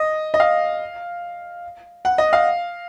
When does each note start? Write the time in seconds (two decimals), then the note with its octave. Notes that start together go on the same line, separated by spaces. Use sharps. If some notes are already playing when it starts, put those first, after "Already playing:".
Already playing: D#5
0.34 D#5
0.40 F5
2.05 F#5
2.18 D#5
2.33 F5